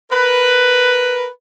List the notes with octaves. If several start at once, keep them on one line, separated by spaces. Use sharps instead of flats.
A#4 B4